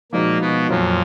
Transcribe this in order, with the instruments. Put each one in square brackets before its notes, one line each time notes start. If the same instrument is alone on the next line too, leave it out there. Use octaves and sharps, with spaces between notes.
[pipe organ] A#2 A#3 [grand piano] F3 G#3 D#4 F#4
[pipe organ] B2 B3
[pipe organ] F2 F3 [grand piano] A#2 F#3 A#3 F4